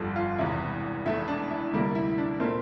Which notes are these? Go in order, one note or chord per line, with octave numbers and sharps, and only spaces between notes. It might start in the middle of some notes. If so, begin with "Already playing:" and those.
Already playing: G1 F2 D3 G3 A4
F4
E1 E2 C3 E3 E4
E1 E2 E3 A3 E4
D4
E4
D2 C3 G3 A#3
E4
D4
A#2 A3 C4 A#4